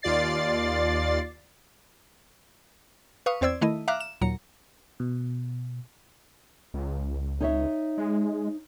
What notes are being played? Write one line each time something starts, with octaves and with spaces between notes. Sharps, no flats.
D#2 F4 D5 A6 C7
B4 F5 C#6 D#6
E2 C4 C5 D5 E6 G#6
D#3 A3 E4 D#5
E5 F5 A#5 D6 F6 F#6
E7
D#2 A#2 F#3 A#5 C#7
B2
C#2
D#4 C#5 E5
G#3